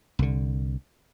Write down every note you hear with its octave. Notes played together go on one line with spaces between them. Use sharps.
C2 D3